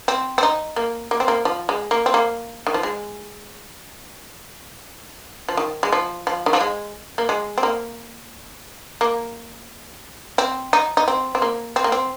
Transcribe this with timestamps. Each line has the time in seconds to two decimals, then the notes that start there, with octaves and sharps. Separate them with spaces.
0.08 C4
0.38 C4
0.43 D#4
0.76 A#3
1.11 A#3
1.20 C4
1.28 A#3
1.45 F3
1.69 G#3
1.91 A#3
2.06 C4
2.14 A#3
2.67 D#3
2.74 F3
2.83 G#3
5.49 F3
5.57 D#3
5.83 G#3
5.93 F3
6.27 F3
6.46 D#3
6.53 F3
6.61 G#3
7.18 A#3
7.29 G#3
7.58 C4
7.63 A#3
9.01 A#3
10.38 C4
10.73 D#4
10.97 D#4
11.08 C4
11.35 C4
11.42 A#3
11.76 C4
11.84 A#3
11.92 C4